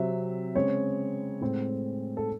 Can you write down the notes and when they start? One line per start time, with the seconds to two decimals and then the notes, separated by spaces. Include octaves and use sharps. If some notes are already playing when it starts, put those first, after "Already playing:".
Already playing: C3 F#3 C4 E5
0.55 C#3 G#3 C4 C#5
1.41 A2 G#3 C4
2.17 A4